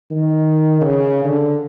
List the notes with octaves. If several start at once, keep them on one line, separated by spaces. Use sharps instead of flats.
D#3
C#3
D3